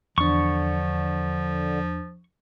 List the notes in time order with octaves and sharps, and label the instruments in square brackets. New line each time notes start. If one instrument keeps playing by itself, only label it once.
[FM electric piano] E2 D4 [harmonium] D3 [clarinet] F3 [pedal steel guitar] C#6